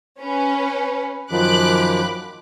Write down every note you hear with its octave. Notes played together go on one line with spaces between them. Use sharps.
C#4 B4
F#2 D#3 F3 B5 D6 F#6